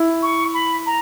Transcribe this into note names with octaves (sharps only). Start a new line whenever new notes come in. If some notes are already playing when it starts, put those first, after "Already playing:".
Already playing: E4
C#6
B5
A#5